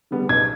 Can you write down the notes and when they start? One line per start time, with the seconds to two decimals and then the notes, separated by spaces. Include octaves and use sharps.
0.11 D3 G3 B3
0.28 B1 G#6